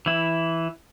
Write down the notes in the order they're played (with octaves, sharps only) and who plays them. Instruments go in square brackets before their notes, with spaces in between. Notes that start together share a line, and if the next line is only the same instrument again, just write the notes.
[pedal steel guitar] E3 E4